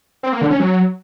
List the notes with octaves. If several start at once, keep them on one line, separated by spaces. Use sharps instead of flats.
C4
A#3
D3
C#4
F#3